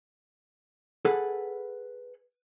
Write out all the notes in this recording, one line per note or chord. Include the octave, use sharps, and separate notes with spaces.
G#4 A4 B4 F#5